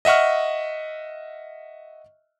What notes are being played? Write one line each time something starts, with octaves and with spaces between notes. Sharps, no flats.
D#5 E5 F#5 C#6 F6